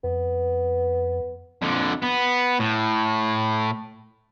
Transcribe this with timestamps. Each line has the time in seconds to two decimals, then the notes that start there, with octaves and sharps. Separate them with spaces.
0.04 F2 B3
1.62 F2 D3
2.02 B3
2.60 A2